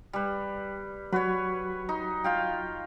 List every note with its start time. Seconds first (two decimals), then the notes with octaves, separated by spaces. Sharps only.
0.13 G3 B4
1.12 F#3 F#4 B4 C#5
1.89 D#4
2.24 F4 F5 G5